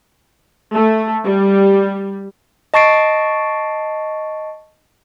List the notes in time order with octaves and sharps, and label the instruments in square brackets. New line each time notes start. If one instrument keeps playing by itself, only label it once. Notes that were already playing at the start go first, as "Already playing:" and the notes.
[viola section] A3
G3
[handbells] D#5 A5 C#6 A6 C7 D7